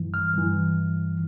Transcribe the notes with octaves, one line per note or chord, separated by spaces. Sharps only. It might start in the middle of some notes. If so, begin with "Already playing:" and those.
Already playing: G2 E3
F6
G2 E3